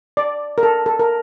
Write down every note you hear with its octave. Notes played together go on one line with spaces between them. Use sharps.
D5
A#4
A4
A4
A#4